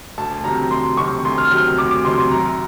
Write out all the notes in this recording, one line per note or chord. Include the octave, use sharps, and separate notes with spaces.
D2 A5
C3 D#3 F#3 A#5
D2 C6
C3 D#3 F#3 C#6
D2 C6
F6
C3 D#3 F#3 F6
D2 D6
D6
C3 D#3 F#3 C6
C6
F#2 A#5